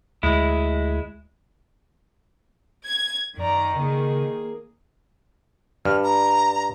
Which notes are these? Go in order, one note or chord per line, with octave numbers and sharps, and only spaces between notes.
D2 G#3 E4
G#6
F#2 D#3 D5 A#5
C#3 A#3 G#4
G2 F6
A#5